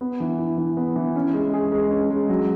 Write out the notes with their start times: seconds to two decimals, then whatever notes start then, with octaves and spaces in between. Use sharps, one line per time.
0.01 B3
0.20 E3
0.38 E4
0.58 E3
0.77 B3
0.96 E3
1.16 C#4
1.34 G#3
1.54 G#4
1.72 G#3
1.91 C#4
2.10 G#3
2.29 F#3